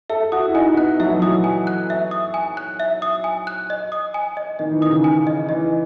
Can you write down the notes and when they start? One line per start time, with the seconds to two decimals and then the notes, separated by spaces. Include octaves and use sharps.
0.09 A4 E5
0.32 F#4 D#6
0.48 E4
0.55 D#4 G#5
0.76 B3 F#6
1.00 F#3 E5
1.09 E3
1.19 F#3 D#6
1.44 G#5
1.67 F#6
1.90 E5
2.11 D#6
2.34 G#5
2.57 F#6
2.80 E5
3.02 D#6
3.24 G#5
3.47 F#6
3.70 D#5
3.92 D#6
4.14 G#5
4.37 D#5
4.59 D#3 D#5
4.72 E3
4.81 D#3 D#6
4.89 C#3
5.04 G#5
5.27 D#5
5.49 E3 D#5